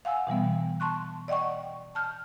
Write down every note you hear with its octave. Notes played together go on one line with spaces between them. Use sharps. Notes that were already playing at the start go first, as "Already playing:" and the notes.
F5 F#5 G#5 E6
B2 E3 G3 B3
A5 C6 C#6 F#6
D5 D#5 F#5 G5 C#6
A5 F6 G6